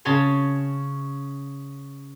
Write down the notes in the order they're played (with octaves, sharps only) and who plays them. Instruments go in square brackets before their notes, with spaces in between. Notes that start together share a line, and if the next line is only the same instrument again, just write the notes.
[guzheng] C#3 C#5 A5 C6